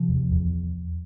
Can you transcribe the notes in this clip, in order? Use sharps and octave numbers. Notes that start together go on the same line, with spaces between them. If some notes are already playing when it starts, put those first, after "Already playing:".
Already playing: C3 F3
E2
E2